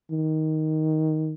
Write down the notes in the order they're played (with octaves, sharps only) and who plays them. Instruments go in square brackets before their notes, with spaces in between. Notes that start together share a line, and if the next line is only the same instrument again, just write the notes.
[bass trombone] D#3